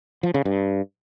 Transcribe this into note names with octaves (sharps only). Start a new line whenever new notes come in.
F3
C#3
G2